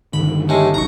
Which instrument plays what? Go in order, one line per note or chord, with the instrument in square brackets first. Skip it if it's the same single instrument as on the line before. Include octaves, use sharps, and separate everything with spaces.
[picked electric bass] G2 D3 D#3 [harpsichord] B5
[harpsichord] A2 G#3 [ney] G4
[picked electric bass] E1 C2 F#3 [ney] D#4 [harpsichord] A#5 C#6